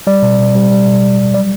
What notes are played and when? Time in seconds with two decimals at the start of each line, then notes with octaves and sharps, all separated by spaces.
0.07 G3 D5
0.22 B2
0.39 B2
0.55 G3
0.71 G3
0.87 B2
1.02 B2
1.19 G3
1.34 F#3 D5